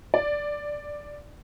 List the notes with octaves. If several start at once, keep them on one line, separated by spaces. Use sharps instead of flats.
D5